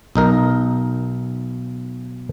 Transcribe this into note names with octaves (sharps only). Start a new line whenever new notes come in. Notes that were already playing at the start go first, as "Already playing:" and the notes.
B1 D#4 A#4